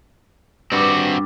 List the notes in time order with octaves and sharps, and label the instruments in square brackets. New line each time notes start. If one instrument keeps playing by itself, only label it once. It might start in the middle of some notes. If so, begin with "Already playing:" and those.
[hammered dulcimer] G2 [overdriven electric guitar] C4 F#4